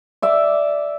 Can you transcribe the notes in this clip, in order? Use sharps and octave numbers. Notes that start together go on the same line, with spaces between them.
D5 E5 D6